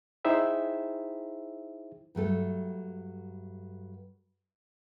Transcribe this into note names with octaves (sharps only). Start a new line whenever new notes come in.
D#4 E4 G#4 C5 E5 G5
G2 F#3 A3 A4